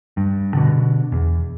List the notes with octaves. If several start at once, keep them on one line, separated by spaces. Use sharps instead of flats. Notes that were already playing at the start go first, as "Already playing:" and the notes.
G2
B2 D3
E2